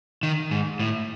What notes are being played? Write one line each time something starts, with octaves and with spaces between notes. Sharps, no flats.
D#3
G#2
A2